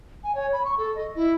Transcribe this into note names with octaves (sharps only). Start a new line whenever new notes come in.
G#5
C#5
B5
C#6
A4
D#5
E4